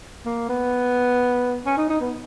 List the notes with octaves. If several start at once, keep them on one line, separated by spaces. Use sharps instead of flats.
A#3
B3
C#4
D#4
D#4
B3